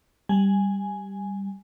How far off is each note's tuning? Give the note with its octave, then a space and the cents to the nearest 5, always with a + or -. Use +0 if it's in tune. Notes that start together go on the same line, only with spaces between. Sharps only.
G3 +5 G#5 +0